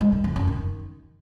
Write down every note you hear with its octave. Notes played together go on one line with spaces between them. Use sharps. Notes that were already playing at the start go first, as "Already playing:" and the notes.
G#3
D#3
F2
F#2
D#3